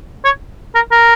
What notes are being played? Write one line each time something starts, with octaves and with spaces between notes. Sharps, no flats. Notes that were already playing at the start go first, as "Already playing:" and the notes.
C#5
A#4
A#4